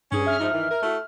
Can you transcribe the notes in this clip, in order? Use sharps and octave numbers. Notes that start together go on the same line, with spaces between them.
G2 C#4 G#4
E5 F6
G#2 F3 D#4
D#3 E3
A#4
A3 E4 F#4